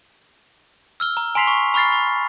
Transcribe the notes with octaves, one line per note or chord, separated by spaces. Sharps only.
E6 F6 G7
A#5
G#5 A#5 C6 B6 C7 F7
C#6
B5 C#6 F6 A6 C7
C#6